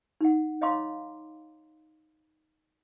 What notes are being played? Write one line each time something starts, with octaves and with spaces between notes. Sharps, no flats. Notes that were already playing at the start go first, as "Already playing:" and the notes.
D#4 F#5
C#5 D#5 F5 A#5 C6 D6